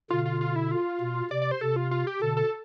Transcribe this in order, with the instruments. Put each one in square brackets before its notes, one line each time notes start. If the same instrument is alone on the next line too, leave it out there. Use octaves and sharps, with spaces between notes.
[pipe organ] B2 D3 [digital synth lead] F4
[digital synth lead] F4
F4
E4
F4
[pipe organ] B2
[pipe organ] C3 [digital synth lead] D5
[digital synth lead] D5
C5
[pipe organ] C3 [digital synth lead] A4
[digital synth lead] F4
F4
G4
[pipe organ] B2 D3 [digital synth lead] A4
[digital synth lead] A4